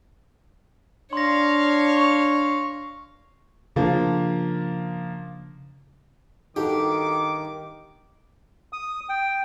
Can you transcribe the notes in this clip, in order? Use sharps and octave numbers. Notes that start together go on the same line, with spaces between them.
D4 C#5 F5 C6 A#6
C#6
C#3 F3 A#3 D4
G2 D#3 D#4 F#4 G4 A4 D6
D#6
G5